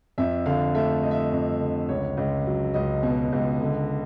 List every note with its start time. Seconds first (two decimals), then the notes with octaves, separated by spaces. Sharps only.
0.18 F2 E5
0.46 D3 F5
0.75 A3 E5
1.03 A3 D#5
1.11 E5
1.18 D#5
1.32 F2
1.60 D3
1.89 C#2 C#5
2.17 C#2
2.46 F#3
2.74 C#2 D#5
3.03 B2
3.32 C#2
3.61 D3